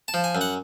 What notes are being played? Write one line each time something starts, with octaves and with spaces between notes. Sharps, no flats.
A5
F3
G#5
F#2
F#5